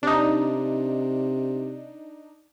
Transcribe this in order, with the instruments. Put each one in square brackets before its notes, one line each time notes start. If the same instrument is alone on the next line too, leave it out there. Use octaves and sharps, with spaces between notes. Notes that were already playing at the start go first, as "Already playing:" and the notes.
[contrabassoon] C3 [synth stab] D4 D#4